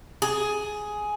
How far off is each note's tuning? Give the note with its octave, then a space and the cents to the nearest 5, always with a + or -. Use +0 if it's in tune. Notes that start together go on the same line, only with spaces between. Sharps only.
G#4 +10